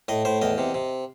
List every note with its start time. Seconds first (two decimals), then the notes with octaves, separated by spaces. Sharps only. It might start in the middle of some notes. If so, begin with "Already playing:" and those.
0.08 A2 D#5
0.25 A2 C5
0.42 E2 D#5
0.58 C3
0.74 C3